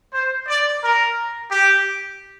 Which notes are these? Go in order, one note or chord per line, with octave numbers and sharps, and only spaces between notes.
C5
D5
A#4
G4